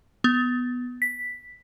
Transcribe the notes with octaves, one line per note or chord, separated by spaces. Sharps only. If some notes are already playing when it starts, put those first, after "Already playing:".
B3
B6